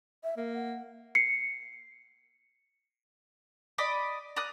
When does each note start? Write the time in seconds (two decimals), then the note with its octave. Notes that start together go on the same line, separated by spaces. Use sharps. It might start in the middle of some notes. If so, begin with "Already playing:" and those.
0.24 E5
0.37 A#3 E5
0.54 F#5
1.15 C7 C#7
3.78 D5 D#5 B5 D6
4.36 D5 A#5 D#6 F#6